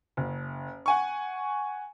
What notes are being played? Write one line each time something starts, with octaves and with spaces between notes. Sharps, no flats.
F#1
F#5 G#5 C#6